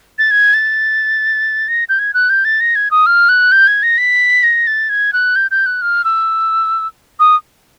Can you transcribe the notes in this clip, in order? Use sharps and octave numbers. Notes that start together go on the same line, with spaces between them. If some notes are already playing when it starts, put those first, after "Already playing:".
A6
G#6
A6
A#6
G6
G#6
F#6
G6
A6
A#6
G#6
D#6
F6
F#6
G6
G#6
A#6
B6
A#6
A6
G#6
F#6
G6
G6
F#6
F6
E6
D#6